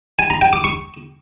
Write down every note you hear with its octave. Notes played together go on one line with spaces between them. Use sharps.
G#5
A#5
G5
D6
C#6